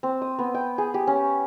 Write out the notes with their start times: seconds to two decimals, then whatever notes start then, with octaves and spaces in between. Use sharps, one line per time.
0.03 C4
0.22 D#6
0.39 B3
0.54 G5
0.78 G#4
0.94 G4
1.07 C#4